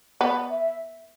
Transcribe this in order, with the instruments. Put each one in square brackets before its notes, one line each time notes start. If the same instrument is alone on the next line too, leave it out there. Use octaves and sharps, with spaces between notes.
[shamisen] B3 [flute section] D5
[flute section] E5